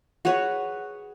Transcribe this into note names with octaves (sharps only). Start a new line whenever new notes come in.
F#4 G#4 B4 C#5